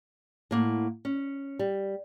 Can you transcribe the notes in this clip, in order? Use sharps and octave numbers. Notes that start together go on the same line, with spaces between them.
A2 A#3 F#5
C#4
G3